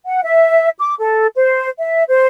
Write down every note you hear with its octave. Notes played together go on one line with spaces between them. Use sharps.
F#5
E5
D6
A4
C5
E5
C5